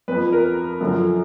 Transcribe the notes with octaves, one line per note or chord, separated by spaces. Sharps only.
F2 F3 B4
A#4
F#2 D3 F3